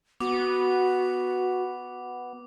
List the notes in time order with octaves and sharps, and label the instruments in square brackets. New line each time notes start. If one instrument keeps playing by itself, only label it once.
[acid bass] B3 [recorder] F#4 [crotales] D6